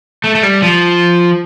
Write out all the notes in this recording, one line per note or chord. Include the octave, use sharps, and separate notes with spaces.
A3
A3
G3
F3